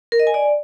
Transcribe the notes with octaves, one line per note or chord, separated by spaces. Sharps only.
A#4
D#5
G#5
D5